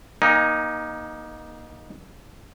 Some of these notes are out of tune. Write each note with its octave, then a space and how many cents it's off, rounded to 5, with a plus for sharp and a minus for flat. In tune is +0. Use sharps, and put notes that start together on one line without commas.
A#3 +25 D#4 +0 G#5 -45